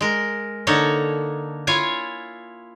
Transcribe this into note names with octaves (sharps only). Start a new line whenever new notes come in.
G#3 A#4
D3 A#3 D#4 A4 C#5
E4 F4 C#5 G#5